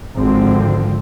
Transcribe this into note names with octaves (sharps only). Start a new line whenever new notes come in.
G#1 D3 F3 C4